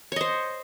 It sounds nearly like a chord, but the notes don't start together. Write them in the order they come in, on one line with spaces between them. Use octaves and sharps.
C#5 D#5 C5